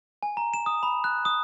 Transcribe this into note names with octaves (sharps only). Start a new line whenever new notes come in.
G#5
A#5
E7
D#6
B5
F#6
D#6